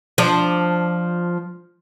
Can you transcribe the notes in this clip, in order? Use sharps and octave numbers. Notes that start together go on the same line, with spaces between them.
F3 D4